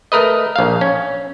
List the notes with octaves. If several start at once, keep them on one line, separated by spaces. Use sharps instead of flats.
A3 A#4 B4 D#5
A#1 F5
C#4